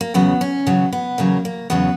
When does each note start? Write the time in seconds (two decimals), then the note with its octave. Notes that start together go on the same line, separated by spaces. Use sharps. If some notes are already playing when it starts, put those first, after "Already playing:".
0.01 A#3
0.14 E2 C#3 F#3 B3
0.41 C#4
0.67 E2 C#3 F#3 B3
0.92 B3
1.18 E2 C#3 F#3 A#3
1.45 A#3
1.70 E2 C#3 F#3 B3